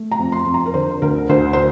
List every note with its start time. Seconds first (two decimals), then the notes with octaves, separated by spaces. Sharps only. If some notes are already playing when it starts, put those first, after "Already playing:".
Already playing: A3
0.12 A#5
0.19 F2
0.32 C6
0.46 F2
0.54 A#5
0.66 A#4
0.74 D3 C5
1.02 D2 A#4
1.29 D2 C5
1.53 C5